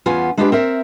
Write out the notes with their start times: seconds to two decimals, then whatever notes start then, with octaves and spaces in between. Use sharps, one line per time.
0.06 E2 B3 C#4 F4 G#5
0.37 G#3 D4 F4 G4 B4 G5
0.52 C4 A#4 E5